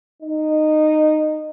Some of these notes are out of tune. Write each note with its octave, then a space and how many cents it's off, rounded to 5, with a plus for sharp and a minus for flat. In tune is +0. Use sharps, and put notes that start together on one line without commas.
D#4 -15